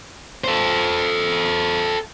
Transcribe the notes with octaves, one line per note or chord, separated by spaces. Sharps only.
A4 C5